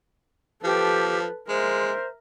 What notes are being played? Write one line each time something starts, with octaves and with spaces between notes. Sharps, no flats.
F3 G4 A4 B4
G#3 A#4 C5 E5